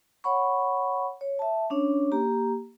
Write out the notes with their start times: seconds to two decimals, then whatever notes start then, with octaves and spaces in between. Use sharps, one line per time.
0.24 C#5 F#5 B5 C#6
1.21 C#5
1.39 E5 A5
1.70 C#4 D4 C#5
2.12 A#3 G4 A#5